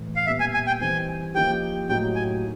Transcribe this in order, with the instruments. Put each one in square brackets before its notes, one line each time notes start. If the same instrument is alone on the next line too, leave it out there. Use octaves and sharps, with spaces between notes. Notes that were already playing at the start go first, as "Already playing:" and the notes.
Already playing: [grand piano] A2 E3
[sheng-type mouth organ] F5
[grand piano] A#2 G3 B3 [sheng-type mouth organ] E5
[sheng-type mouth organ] G#5
G#5
G5
[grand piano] E3 G3 C4 D#4 [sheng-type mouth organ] G#5
[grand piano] F3 A#3 D#4 G4 [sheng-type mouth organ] G5
[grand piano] A2 F#3 A#3 D#4 G4 [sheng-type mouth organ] G5
[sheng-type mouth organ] G#5